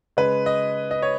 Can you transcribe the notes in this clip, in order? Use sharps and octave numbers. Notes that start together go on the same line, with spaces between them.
C#3 G#3 B4
D#5
D#5
C#5